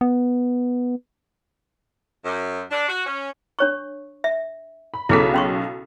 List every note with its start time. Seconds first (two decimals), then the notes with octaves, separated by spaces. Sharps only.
0.01 B3
2.25 F#2
2.71 D4
2.89 F#4
3.06 C#4
3.59 D4 C#5 C#6
4.24 E5
4.94 B5
5.09 B1 C#3 E4 G#4 A4 B6
5.34 C#4 C6 C#6